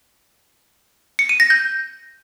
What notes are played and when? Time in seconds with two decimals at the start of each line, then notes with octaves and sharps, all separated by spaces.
1.19 C#7
1.29 D#7
1.40 A#6
1.50 G6